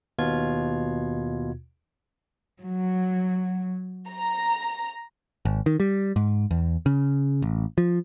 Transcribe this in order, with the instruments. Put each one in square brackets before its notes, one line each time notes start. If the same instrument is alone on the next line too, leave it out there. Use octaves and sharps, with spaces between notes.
[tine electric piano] D#2 B2 F4 G#6
[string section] F#3
A#5
[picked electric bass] G#1
D#3
G3
G#2
E2
C#3
A1
F3